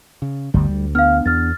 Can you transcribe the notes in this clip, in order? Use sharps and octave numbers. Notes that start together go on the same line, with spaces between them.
C#3
G1 D2 G2 G3
D2
B3 D4 F5 F6
E2 F6 A6